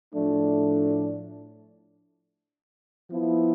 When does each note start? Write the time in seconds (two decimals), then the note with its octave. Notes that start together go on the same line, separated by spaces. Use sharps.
0.14 A2 F3 A3 D4
3.11 F3 B3 E4